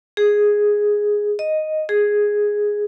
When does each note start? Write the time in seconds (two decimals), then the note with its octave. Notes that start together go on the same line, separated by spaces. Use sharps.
0.17 G#4
1.39 D#5
1.89 G#4